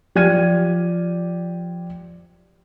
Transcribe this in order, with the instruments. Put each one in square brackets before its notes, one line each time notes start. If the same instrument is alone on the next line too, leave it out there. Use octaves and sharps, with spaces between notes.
[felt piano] F3 G4 D5 F6 G#6 D#7